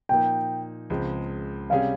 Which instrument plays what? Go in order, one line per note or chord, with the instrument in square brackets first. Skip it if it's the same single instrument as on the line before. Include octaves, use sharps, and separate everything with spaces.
[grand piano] A#2 F3 A#3 D#4 [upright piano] G5
[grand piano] C#2 C#3 F3 G#3 C4
[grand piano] C3 G3 C#4 G#4 [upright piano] F5